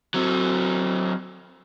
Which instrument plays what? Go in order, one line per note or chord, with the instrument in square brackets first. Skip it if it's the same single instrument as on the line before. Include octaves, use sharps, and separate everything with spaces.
[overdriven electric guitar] F#3 C4